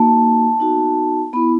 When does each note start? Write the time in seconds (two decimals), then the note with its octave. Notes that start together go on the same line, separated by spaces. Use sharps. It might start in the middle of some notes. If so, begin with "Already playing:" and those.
Already playing: A#3 D#4 F#4 A5
0.59 B3 D#4 F#4
1.33 B3 E4 B5